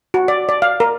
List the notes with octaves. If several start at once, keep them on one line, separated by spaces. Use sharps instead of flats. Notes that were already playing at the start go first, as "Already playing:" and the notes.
F#4
D5
D5
F5
A#4